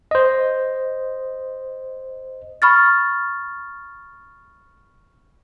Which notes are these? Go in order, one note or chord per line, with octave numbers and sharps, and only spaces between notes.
C5 D#5
B5 C#6 F6 A6